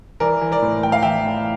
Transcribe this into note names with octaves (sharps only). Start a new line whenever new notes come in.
E3 A#4 D5
E3
A#4 D5
A2
E3 G5
F5
E3 E5 G5
A2